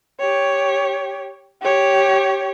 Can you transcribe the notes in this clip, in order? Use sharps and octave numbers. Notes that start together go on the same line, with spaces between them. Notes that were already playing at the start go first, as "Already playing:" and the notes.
G4 C#5
G4 C#5